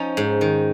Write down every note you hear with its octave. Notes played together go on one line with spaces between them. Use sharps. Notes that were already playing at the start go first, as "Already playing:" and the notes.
Already playing: F3 C#4 D#4
G#2
D#3